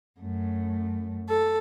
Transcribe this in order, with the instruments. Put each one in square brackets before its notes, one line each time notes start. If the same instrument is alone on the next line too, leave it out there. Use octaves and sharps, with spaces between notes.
[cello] F#2 A3
[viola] A4